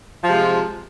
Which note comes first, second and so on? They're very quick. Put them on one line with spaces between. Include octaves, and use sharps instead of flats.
F3 C3 G#3